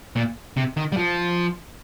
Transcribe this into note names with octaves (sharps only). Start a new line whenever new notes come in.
A#2
C3
D#3
G3
F3